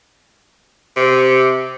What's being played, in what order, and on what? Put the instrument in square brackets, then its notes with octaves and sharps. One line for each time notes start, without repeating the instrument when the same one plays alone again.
[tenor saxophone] C3